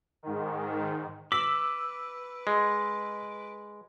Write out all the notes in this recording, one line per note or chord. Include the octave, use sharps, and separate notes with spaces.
G#2 D#3
B4 D6 E6 B6 F#7
G#3